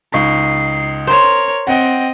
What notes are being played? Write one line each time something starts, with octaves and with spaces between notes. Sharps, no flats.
C#2 D#4 C#6 C7
A#4 C5 C#5
C4 D#5 F#5 G5